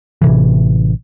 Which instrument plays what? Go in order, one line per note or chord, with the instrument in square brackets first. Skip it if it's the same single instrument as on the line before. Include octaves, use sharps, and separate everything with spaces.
[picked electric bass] A1 C3 E3